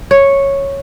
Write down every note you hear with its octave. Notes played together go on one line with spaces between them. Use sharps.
C#5